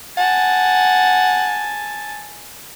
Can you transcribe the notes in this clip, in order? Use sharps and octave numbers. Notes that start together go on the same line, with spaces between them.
F#5 G#5 A5